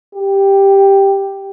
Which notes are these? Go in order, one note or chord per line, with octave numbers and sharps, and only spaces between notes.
G4